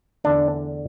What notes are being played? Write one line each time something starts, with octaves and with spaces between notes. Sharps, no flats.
E2 D3 A3 D4